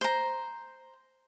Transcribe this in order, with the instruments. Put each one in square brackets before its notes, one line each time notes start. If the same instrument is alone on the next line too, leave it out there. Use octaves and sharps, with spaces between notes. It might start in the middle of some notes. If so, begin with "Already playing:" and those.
[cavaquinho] C5 A#5